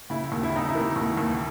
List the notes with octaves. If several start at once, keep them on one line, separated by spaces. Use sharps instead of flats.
C#3 E4
D#2
E4
C#3 D#4
E4
E3
D#2
D#2